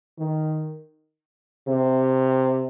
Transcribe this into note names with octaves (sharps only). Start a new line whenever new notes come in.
D#3
C3